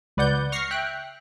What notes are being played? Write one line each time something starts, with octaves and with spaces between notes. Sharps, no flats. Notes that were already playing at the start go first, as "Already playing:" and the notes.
C#2 B4 D5 F#5 G6
C#6 F6 A#6 C7
E5 G5 F#6